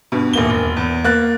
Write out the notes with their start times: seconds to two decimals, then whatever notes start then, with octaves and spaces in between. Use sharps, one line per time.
0.12 G2 B2
0.33 D#1 A#3 G7
0.50 E1
0.77 E2
1.04 A#3 F#6 A6